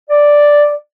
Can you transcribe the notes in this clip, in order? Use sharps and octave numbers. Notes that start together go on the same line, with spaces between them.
D5